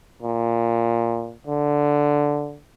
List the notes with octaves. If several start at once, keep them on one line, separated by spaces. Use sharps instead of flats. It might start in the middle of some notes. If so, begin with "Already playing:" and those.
A#2
D3